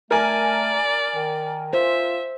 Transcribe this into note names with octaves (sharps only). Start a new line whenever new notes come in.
A3 A#4 D5 G#5
D#3
F4 C5 E5